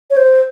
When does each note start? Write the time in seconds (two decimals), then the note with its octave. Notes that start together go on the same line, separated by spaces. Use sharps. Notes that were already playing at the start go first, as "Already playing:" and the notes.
0.10 C#5
0.17 C5